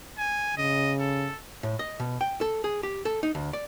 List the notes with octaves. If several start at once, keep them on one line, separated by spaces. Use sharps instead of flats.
G#5
C#3 D#5
A4
A2
D#5
B2
G5
A4
G#4
G4
A4
D#4
D2
D5